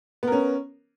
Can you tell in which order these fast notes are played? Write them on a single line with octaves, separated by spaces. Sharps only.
B3 A#4 C#4